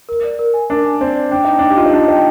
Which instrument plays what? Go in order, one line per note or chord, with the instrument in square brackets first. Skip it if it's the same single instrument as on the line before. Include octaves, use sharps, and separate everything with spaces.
[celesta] A#4
D5
A#4
G#5
[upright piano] D4 [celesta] A#4
[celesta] G#5
[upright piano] C4 [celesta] D5
[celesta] D5
[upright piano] D4 [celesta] G5
[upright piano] D#4 [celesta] G5
[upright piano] D4 [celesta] G5
[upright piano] G4
[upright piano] F4 [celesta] D#5
[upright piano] D#4
[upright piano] D4 [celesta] D#5
[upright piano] D#4 [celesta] G5